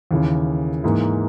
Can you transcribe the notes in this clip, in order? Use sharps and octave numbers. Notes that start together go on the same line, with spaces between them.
D#2 C#3 E3
G#2 E3 A#3